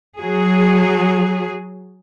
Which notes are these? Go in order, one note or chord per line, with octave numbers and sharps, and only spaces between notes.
F#3 G#4